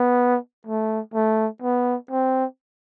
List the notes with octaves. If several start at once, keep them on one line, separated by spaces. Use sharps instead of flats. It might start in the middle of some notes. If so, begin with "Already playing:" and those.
Already playing: B3
A3
A3
B3
C4